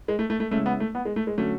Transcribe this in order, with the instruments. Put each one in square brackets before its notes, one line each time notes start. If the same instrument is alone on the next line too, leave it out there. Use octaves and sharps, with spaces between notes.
[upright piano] G#3
A3
A3
A3
[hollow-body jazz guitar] C#2 C#3 G#3 C#4 E4 [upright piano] A3
[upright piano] B3
A3
B3
G#3
A3
G#3
[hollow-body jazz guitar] D3 F#3 C#4 F#4 [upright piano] A3